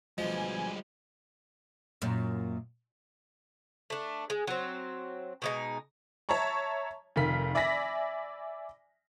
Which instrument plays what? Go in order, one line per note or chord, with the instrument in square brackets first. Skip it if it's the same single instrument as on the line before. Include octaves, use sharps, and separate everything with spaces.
[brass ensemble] D2 B2 G#5 [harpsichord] F3 [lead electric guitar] G3 G#3 [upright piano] D#5
[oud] F#2 A#2
[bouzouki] A3 D4
G#3
F#3 C4
B2 G#3 D#4
[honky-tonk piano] C#5 E5 A5 A#5 C#6
F1 D#3 A#4 F5 B6
D5 E5 G#5 B5 A#6 B6